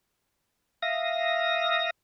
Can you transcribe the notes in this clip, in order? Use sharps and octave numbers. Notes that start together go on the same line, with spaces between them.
E5 F5 D#6 A#6